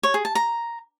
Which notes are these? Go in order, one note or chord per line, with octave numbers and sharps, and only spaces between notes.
C#5
G#4
A5
A#5